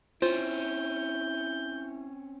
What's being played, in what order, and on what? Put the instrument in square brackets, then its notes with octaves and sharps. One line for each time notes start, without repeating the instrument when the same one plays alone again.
[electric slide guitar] C4 C#4 [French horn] E4 [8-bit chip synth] F4 C5 [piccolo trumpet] G6